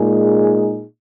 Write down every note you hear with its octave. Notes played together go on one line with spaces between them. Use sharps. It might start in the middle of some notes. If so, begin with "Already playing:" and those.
Already playing: A#2 G#3 D#4 G#4